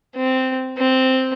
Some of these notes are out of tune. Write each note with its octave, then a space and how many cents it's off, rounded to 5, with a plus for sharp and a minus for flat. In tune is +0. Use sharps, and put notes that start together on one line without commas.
C4 -10
C4 -5